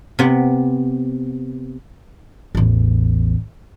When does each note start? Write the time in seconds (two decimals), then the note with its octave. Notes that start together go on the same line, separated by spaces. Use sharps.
0.19 C3 B3
2.55 A1 E2